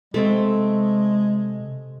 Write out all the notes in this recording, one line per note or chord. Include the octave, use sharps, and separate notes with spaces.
C3 G#3 A3 C4